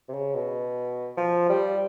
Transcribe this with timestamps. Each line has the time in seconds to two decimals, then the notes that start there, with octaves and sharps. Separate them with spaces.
0.09 C3
0.13 C#3
0.34 B2
1.17 F3
1.49 G3